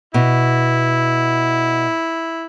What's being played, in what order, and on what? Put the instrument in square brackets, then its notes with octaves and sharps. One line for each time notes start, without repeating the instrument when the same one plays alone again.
[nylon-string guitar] B2 [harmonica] E4